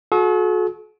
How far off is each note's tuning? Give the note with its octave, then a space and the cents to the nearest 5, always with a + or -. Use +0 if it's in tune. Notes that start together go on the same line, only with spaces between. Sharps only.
F#4 -30 A4 -45